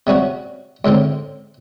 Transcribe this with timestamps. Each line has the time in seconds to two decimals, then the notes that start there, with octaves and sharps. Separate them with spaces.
0.07 C3 G3 C#4 F#4
0.85 C#2 A2 D3 C4